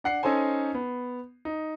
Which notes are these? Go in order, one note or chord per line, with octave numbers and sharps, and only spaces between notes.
D4 F#5 C7
C#4 D#4 A4 C5 G#5
B3
D#4